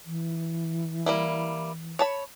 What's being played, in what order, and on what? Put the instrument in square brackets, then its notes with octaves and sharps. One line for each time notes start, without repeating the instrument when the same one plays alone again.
[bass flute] E3
[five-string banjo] G3 A#3 E4
C#5 A5 B5